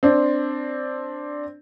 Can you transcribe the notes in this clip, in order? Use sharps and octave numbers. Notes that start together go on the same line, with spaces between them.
C4 D4